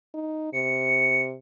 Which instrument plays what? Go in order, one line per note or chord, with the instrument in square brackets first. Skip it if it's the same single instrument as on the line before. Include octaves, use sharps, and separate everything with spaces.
[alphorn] D#4
[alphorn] C3 [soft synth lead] C#7